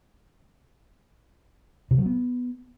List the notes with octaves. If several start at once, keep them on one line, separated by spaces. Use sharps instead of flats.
C3
F#3
B3